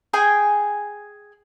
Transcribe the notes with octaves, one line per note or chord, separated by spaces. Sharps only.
G#4 G5 G#5